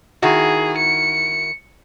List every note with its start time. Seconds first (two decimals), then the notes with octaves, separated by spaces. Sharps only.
0.22 D#3 E4 F#4 G#4
0.78 C#7